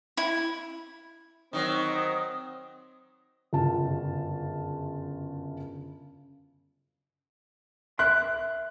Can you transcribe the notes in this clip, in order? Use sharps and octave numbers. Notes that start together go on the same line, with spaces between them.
E4
D#3 F#3 C4 D#6
G1 F#2 C#3 F4 A5
A#4 E5 C6 F#6